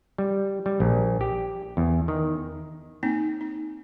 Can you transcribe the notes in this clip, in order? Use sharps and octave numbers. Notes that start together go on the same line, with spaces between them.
G3
G3
A#1
G4
E2
D#3
A#3 C4 D#4
D#4